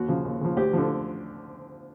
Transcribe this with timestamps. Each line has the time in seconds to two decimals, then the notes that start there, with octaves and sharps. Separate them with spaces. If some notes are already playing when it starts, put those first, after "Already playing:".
Already playing: D#2 F#4
0.08 C#3 F3
0.25 D#2
0.41 C#3 F3
0.57 D2 G4
0.73 D3 F3